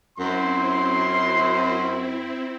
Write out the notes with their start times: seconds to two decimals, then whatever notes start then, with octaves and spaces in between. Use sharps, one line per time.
0.18 F#2 C4 E4 C6